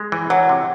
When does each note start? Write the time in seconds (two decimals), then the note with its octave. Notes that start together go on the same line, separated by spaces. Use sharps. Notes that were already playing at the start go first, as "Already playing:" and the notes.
Already playing: G#3
0.12 E3
0.30 E3 F#3
0.49 C3